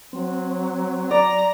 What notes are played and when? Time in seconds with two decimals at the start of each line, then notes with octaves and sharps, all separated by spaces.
0.13 F#3 C4
1.11 D5 A#5